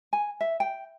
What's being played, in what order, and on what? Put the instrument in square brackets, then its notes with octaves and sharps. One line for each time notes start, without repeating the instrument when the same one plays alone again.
[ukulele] G#5
E5
G5